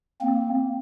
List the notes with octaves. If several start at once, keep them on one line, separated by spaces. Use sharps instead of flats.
A#3 C4